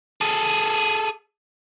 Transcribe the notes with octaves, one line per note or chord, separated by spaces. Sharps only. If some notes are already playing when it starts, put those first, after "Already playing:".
G#4 A4